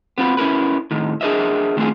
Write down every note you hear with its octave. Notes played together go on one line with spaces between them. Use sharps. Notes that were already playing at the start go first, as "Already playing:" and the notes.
B3 C4 F4 B4
C#4 E4 A#4 B4
A2 D#3
D4 G#4 A#4 C5 D#5 E5
D#3 A3 C4 F4 G#4